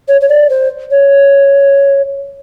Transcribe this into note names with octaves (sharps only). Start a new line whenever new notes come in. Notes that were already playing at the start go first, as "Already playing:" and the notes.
C#5
C#5
D5
C5
C#5